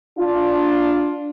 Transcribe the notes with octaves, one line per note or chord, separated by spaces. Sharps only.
D4 F4